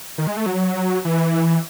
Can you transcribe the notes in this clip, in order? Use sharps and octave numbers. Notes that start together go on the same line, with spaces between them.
D#3
G#3
A3
F#3
E3